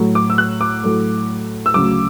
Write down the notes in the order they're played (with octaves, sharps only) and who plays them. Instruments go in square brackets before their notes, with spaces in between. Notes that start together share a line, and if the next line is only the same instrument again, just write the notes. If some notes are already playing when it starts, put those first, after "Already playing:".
Already playing: [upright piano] A2 F#3 A3
D6
E6
F#6
D6
A2 F#3 A3
E6
D2 C#3 F#3 D6